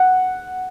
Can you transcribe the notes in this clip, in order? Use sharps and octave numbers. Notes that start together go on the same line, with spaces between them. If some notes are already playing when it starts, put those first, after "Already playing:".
Already playing: F#5